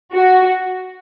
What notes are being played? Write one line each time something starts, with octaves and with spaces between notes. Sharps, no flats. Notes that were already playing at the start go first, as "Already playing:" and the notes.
F#4